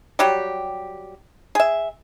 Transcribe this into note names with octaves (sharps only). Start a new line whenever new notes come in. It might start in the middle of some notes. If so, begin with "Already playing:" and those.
F#3 G3 G4
G#4 E5